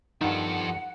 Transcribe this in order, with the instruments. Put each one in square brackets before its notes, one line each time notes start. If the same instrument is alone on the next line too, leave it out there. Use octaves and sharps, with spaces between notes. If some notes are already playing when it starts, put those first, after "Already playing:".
[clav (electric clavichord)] G2 D#3 [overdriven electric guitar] F3 A4 [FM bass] D#4 [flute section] F#5